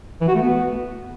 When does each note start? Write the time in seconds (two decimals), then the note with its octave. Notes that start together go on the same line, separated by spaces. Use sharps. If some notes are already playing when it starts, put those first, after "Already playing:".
0.21 E3
0.28 F#4
0.35 A3
0.42 B3